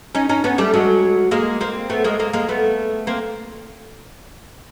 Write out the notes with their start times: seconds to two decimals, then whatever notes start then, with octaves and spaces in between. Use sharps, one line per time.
0.15 C#4 D#4
0.29 C#4 D#4
0.44 B3 C#4
0.58 G3 A3
0.74 F#3 G#3
1.31 G#3 A#3
1.61 A#3 C4
1.90 A3 B3
2.04 G#3 A#3
2.19 G#3 A#3
2.33 G#3 A#3
2.48 A3 B3
3.07 A#3 C4